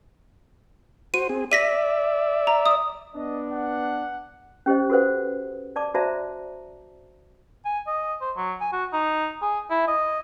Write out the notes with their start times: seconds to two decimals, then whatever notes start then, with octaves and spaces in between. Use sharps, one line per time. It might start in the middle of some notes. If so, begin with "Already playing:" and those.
1.14 F#4 C5 D#7
1.29 C4 G#4
1.52 D5 E5 A#6 B6 D#7
2.47 A#5
2.66 D#6
3.15 B3 D4 D#5
3.52 F#5
4.66 C#4 G4 C5 D#5
4.90 F#4 A4 B4 C5 F#5
5.76 D5 A5 D6
5.94 F#4 C5 D5 E5 A5 A#5
7.65 G#5
7.87 D#5
8.21 C5
8.37 F#3
8.61 G#5
8.73 F#4
8.93 D#4
9.42 G#4
9.70 E4
9.88 D#5